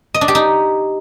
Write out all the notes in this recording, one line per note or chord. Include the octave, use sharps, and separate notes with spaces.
D#5
D4
G4
D#4